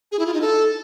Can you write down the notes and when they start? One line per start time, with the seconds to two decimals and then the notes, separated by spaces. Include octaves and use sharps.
0.12 G#4
0.19 E4
0.27 F4
0.34 D#4
0.41 A4